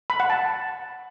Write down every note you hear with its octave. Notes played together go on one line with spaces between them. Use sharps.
B5
F#5
A5